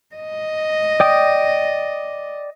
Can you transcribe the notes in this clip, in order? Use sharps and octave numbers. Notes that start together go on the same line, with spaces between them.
D#5
D5 G5 D#6